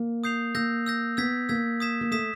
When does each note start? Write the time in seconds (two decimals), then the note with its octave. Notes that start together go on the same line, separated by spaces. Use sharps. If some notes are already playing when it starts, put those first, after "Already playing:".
Already playing: A#3
0.24 D#6 G6 C7 F7
0.55 A#3 E6 G6 A#6
0.86 E6 G6 A#6
1.17 B3 E6 G#6 B6
1.49 A#3 E6 G#6 B6
1.80 D#6 G#6 B6 E7
2.01 A#3
2.11 A3 D#6 G#6 B6 E7